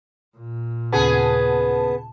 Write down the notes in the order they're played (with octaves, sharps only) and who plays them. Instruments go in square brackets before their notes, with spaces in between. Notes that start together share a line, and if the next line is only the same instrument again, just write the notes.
[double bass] A#2
[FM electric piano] D#2 C#3 A5 [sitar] B3 G#4